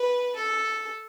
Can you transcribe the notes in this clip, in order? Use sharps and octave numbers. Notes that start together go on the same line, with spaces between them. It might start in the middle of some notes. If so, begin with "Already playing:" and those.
Already playing: B4
A4